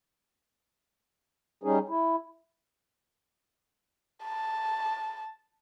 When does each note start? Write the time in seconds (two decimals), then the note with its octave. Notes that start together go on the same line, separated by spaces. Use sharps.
1.63 G3 C#4 D#4 G#4
1.88 E4
4.24 A5